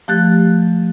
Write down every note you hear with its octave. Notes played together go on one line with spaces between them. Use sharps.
F3 A3 G4 F#6 A6